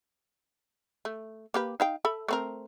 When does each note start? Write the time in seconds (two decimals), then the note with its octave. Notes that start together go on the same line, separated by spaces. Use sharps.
1.05 A3
1.54 A#3 G4 B4
1.80 D#4 F5 G5
2.05 A4 E5 B5
2.28 A3 C4 A#4